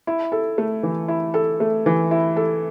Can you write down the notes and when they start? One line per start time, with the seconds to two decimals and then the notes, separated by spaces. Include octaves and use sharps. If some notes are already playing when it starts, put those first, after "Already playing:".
0.07 E4
0.32 A4
0.58 A3
0.83 E3
1.08 E4
1.34 A4
1.60 A3
1.86 E3
2.11 E4
2.36 A4